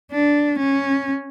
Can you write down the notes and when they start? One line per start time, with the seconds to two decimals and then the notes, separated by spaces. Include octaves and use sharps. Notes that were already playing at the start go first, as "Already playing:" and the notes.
0.12 D4
0.59 C#4